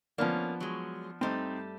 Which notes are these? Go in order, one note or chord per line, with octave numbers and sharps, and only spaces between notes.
F3 A#3 B3 C#4 D4
F#3 G#3
G2 G3 A3 C4 D#4